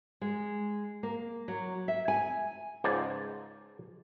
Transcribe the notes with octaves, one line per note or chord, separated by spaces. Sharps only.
G#3
A#3
F#3
E5
G#5
C#2 G#2 C5 D5 G#5 A5